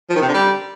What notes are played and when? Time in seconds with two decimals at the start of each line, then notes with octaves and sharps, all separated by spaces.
0.10 F3
0.16 D#3
0.22 C3
0.28 D3
0.34 G3